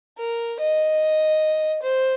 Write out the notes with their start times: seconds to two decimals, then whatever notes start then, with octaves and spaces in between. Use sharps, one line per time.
0.18 A#4
0.60 D#5
1.83 C5